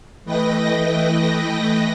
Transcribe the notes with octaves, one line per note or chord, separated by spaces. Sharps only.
E3 A3 B4 D#5 G5 A#6